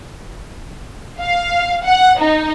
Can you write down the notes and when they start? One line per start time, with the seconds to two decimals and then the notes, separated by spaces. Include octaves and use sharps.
1.20 F5
1.85 F#5
2.19 D#4